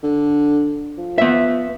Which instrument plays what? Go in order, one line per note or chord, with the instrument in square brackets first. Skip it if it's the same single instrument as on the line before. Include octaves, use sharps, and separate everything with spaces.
[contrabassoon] D3
F3
[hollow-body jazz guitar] B3 E5